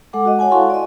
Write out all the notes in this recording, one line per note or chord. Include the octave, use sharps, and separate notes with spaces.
G#3 A4 F#5 D6
F#4 D#5
C#5 F#5 G#5 A5
E4 F#4 A4 F5 C6 C#6
D5 D#5